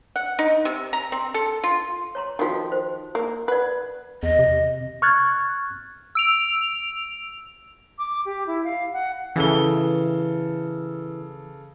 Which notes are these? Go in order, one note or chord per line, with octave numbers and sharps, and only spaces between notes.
F#5
D#4
C3
A#5
C4
A4
F4
C#5 A#5 C6
D#3 F3 F4 F#4 A4
C5
A#3
B4 D5 F#5
E2 D#5
C3
C#6 F6 F#6 G#6 A6
E6 D7 F7
D6
G4
E4
F5
F#5
C#3 E3 A4 G7